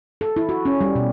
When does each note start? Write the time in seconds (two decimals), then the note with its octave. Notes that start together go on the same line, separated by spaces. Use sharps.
0.21 A4
0.37 E4
0.49 F#4
0.65 C#4
0.81 G3
0.95 B2